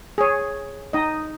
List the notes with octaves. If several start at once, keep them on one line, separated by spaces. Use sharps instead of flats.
G#4 C#5
D#4 D#5